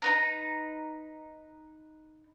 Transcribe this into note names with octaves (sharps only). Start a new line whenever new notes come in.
D#4 B4 A#5